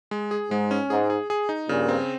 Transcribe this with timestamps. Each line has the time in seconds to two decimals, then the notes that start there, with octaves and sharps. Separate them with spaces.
0.11 G#3
0.31 G#4
0.50 G#2 G#3
0.71 C#4
0.90 G#2 G#4
1.10 G#4
1.30 G#4
1.49 D#4
1.69 G2 A#2 C#3
1.89 C4